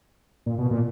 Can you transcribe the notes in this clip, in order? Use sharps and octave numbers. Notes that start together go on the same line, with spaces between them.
A#2
B2
A#2